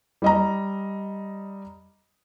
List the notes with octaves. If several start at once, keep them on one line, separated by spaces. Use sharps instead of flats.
G3 D#5 A#5